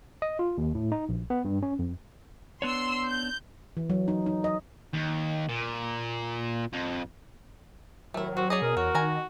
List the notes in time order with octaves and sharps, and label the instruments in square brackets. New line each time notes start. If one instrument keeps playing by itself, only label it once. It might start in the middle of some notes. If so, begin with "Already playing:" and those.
[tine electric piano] D#5
F4
D#2
A2
D#4
A#1
B3
G2
C#4
F2
[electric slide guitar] B3 D4 C#5 [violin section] C6 E6
[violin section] G6
[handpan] E3
F#3
D#4
D#4
D#5
[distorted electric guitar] D#2
A#2
F2
[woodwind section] C2 A2 D#3 [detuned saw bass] F#3 [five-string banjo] A3 E4
[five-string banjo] C4 [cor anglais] F#4
[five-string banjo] C#4 D5 D#5 [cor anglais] G#4
[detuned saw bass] B2 [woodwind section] A#4
[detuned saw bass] E2 [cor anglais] F#4 [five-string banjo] C#5
[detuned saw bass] D#3 [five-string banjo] G#5 A#5